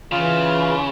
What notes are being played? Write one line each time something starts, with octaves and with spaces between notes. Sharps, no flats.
C#3 E3 F4